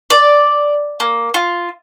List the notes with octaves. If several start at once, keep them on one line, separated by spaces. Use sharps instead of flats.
D5
A#3
F4